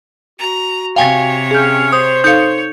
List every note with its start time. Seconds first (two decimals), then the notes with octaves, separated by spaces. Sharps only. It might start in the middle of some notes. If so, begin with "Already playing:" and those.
0.40 F#4 A#5
0.96 C3 C#5 F5 G5 G#5
1.51 C#4 G#4 G6
1.92 C5 D#6
2.24 D#4 A4 C#5 F5 G6 C#7